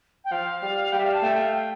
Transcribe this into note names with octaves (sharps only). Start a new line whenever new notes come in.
G5
F3 F5
G3
G3 G5
E5
F5
A5
A3 G5
F5
G5